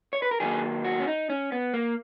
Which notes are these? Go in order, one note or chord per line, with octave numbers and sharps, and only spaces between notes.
C#5
B4
A#4
D#3 F#3 A#3 G#4
F#4
C#4
D#4
C#4
B3
A#3